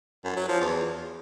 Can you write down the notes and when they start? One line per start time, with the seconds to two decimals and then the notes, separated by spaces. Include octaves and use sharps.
0.25 F#2
0.37 F#3
0.49 F3
0.60 E2